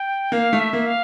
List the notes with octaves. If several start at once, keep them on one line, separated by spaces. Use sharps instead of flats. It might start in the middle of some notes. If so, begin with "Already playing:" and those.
Already playing: G5
A#3 F5
A3
E5
A#3
F5